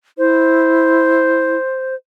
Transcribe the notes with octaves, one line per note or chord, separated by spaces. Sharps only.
E4 C5